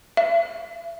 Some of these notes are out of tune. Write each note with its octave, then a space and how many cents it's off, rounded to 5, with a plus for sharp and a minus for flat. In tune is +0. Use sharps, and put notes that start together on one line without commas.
E5 +35